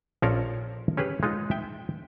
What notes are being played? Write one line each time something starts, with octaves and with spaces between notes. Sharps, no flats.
A#1 F3 C#4 A4 A#4 F5
C#4 G4 G#4 B4
G#3 D#4 F4
E5 G5